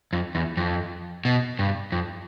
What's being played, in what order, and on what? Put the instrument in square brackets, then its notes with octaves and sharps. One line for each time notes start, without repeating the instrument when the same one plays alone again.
[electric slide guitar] F2
E2
F2
B2
G2
F2